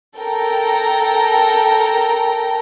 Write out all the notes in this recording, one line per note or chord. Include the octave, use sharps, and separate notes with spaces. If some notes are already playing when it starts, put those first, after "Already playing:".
A4 A#4 G5 A#5